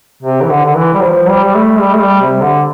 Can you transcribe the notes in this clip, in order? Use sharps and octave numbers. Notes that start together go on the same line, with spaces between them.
C3
E3
D3
D3
E3
G3
F3
G3
G3
A3
G3
A3
G3
C3
D3